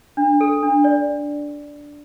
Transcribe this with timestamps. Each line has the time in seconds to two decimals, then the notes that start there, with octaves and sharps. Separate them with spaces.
0.17 D4
0.40 A4
0.63 D4
0.84 D5